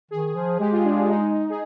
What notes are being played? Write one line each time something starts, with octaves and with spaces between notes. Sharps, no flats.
D#3 G#4
F3
G#3 G4
F4
D4
D4
D#4
D#4
G#4